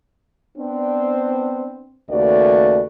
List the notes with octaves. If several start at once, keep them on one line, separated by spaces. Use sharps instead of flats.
B3 C4 D4
D#2 C#3 A3 F#4 B4 D5